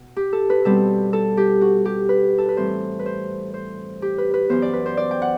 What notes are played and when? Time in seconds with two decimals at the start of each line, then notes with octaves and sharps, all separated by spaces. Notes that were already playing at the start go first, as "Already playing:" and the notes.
Already playing: B2
0.16 G4
0.33 A4
0.50 B4
0.65 B2 G3 C4 A4
1.13 A4
1.37 G4
1.61 F#4
1.85 G4
2.09 B4
2.38 A4
2.49 B4
2.57 A2 E3 G3 C4 C5
2.99 B4
3.06 C5
3.54 C5
4.02 G4
4.18 B4
4.34 B4
4.49 F#2 E3 B3 C5
4.62 D5
4.73 B4
4.86 C5
4.97 D5
5.11 G5
5.22 F#5